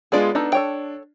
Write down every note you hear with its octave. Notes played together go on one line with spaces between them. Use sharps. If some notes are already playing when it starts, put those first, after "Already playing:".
G#3 B3 D4 F4 G#4 D5
B3 D4 D#4 A4
A4 C#5 G5